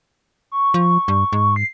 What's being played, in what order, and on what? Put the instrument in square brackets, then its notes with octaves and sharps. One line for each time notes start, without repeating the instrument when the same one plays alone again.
[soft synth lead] C#6
[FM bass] F3
G2
G#2
[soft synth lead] C7